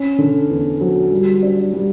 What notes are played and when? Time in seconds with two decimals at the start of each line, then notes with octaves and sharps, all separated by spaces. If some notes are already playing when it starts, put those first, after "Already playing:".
Already playing: C#4
0.18 D3
0.50 E2
0.81 F#3
1.12 G3
1.43 D4
1.73 G3